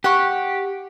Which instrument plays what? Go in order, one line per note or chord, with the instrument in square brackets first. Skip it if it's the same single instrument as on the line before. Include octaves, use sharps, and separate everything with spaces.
[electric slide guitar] G4 [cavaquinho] F#5 C#6